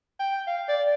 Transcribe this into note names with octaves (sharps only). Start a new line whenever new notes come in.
G5
F5
D5